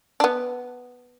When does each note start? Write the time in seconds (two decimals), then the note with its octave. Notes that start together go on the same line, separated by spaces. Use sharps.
0.20 D4
0.24 B3